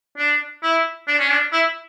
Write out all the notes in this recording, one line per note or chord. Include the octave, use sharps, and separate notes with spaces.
D4
E4
D4
C#4
D4
E4